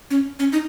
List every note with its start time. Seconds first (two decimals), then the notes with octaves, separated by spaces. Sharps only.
0.10 C#4
0.39 C#4
0.52 D#4